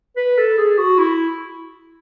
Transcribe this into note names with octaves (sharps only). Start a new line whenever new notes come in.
B4
A4
G#4
F#4
E4